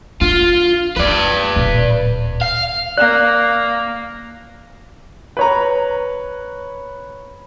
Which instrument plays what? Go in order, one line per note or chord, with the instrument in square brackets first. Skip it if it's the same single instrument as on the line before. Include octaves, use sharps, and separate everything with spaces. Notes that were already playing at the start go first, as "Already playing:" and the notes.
[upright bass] D4 [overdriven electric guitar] F4
[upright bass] A#3 B3 [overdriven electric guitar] B4 D5
[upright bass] D1 A#2
[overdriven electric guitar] F5
[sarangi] A#3 [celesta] D5 [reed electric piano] F#6
[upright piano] B4 C#5 A#5